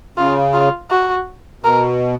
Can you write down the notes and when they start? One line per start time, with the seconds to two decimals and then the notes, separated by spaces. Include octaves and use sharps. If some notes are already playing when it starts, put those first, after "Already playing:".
0.17 C#3 F4
0.53 F4
0.91 F#4
1.64 B2 A#4